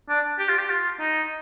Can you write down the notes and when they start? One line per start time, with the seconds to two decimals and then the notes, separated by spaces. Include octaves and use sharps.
0.09 D4
0.39 G4
0.49 F4
0.58 G4
0.70 F4
1.00 D#4